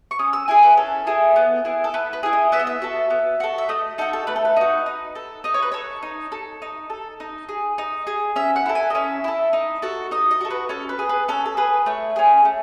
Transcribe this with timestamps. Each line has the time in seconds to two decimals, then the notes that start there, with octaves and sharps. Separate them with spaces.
0.11 C#6
0.19 C#4 D#6
0.33 E6
0.48 E4 G#4 G#5
0.63 B4
0.77 C#4 A4
1.07 E4 G#4
1.36 B3
1.65 E4 G#4
1.84 A4
1.94 B3 B4
2.13 B4
2.23 E4 G#4
2.33 D#5
2.52 B3 E5
2.59 D#5
2.67 E5
2.82 F#4 A4
3.10 B3
3.40 F#4 A4
3.58 E5
3.69 A3 D#5
3.98 D#4 F#4 A4
4.13 A4
4.27 A3 B4
4.36 A4
4.45 B4
4.57 D#4 F#4
4.86 D#4
5.15 A4
5.44 D#4 D#5
5.54 C#5
5.62 B4
5.72 A4 C#5
6.03 D#4
6.32 A4
6.62 D#4
6.90 A4
7.20 D#4
7.49 G#4
7.78 D#4
8.07 G#4
8.36 C#4 E5
8.56 F#5
8.66 E4 A4
8.75 G#5
8.90 D#5
8.95 C#4 E5
9.24 E4 A4
9.53 D#4
9.82 F#4 A4
10.11 D#4 D#5
10.31 D#5
10.41 F#4 A4
10.50 B4
10.69 C#4 A4
10.89 B4
10.99 G#4
11.09 B4
11.28 C#4 A4
11.46 A4
11.57 G#4 B4
11.86 A3 C#5
12.16 C#4 G#4
12.45 A3